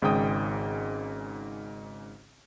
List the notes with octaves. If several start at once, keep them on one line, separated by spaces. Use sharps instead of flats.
G#1 G#2 C#3 G5 D#6